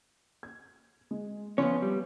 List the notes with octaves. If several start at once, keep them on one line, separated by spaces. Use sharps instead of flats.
G#6
G#3
F3 B3 C#4 F4 C#5
G3